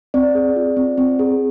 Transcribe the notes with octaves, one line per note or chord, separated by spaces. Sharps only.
C4 D5
G#4
F4
C4
C4
G#4